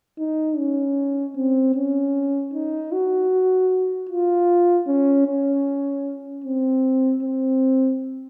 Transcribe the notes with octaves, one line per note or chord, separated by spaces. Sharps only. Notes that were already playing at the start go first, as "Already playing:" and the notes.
D#4
C#4
C4
C#4
D#4
F#4
F4
C#4
C#4
C4
C4